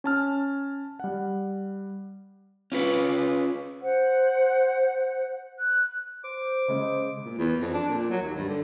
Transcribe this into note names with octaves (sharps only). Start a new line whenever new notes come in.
C#4 A5 F6
G3 F#5
C#4 F4 B4
C5 F#5
F#6
C5 D6
C#3 G#3
A#2
E2
F2
D4
A#2
F#3
D#2
G2
D3